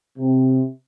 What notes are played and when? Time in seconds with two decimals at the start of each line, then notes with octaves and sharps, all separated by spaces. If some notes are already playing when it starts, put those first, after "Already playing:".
0.18 C3